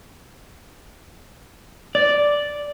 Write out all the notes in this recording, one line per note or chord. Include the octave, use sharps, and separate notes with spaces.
D5